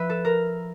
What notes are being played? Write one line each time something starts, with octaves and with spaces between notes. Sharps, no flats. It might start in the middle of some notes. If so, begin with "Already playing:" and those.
Already playing: F3 B4 E5
A4
A#4